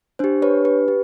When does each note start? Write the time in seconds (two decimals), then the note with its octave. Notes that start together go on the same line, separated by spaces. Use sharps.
0.19 D4 G4 C5
0.42 B4 C#5
0.65 B4
0.88 G4